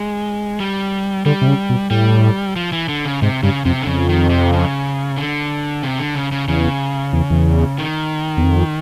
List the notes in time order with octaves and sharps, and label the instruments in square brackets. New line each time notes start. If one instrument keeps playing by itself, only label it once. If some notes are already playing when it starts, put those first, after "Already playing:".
Already playing: [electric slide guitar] G#3
G3
[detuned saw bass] D3 [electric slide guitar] G3
[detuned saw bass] C3
C#3
B2
[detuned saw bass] A2 [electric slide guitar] G3
[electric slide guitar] F3
E3
D3
C#3
[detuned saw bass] G#2 [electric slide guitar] C3
[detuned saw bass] G2 [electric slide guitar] C#3
[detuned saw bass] F2 [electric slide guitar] C3
[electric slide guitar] D3
[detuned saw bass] F2 [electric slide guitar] C#3
[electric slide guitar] D#3
C3
C#3
D3
C3
D3
C#3
C#3
[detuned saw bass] E2 [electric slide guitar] C#3
[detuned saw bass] E2
E2
[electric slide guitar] D#3
[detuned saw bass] E2
F2